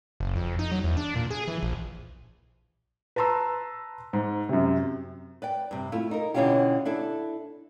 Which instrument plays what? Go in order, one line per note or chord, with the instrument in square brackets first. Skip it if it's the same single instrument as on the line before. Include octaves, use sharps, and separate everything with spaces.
[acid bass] F#1
F2
D#4
F#3
E2
D4
A#2
G#4
E3
A#1
[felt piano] B4 A5 A#5 C6 E6
G#2
F#2 C3
[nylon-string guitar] B4 D5 G5
G2 C3
A3 E4 F4
D#4 A#4
B2 D3 E3 C#4 F4 G4
D4 E4 A4